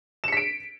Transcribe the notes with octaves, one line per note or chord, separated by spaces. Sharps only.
B6 C#7 D7 E7